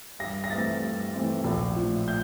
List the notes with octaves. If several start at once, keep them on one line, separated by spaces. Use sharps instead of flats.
G2 A#6
A#6
E3 A3 C4 A6
G2
E3 A3 C4
A#1
A2 F3
G6